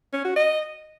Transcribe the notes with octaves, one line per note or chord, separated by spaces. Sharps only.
C#4
F#4
D#5